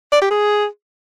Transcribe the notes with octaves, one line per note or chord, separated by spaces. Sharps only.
D5
G4
G#4